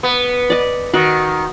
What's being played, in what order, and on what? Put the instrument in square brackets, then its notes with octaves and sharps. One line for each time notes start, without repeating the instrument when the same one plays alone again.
[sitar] B3
[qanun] D5 D#5
[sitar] D#3 [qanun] F#4